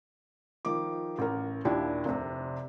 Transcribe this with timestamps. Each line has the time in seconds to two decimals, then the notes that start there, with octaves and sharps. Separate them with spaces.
0.65 D#3 F3 D6
1.18 A1 A#4
1.65 D#2 A#2 D4 E4 G4
2.05 F1 C3